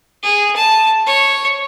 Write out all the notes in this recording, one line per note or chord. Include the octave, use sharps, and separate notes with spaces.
G#4
A5
C#5